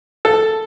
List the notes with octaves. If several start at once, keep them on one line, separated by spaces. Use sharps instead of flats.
A4